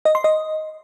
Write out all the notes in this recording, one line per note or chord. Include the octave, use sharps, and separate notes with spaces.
D#5
C6
D#5